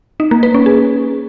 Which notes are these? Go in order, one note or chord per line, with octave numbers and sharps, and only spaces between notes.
D#4
A#3
B4
C#4
G#4